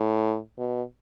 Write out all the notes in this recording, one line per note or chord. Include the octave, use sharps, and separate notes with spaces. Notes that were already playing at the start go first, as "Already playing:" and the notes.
Already playing: A2
B2